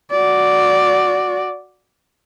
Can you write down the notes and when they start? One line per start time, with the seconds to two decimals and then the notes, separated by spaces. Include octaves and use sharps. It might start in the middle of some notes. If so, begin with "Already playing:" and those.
0.11 F#4 D5